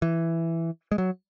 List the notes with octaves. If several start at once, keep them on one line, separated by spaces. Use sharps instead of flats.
E3
G#3
F#3